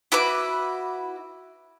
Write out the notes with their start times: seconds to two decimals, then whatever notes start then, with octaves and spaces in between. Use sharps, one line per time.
0.12 E4 F#4 B4 D6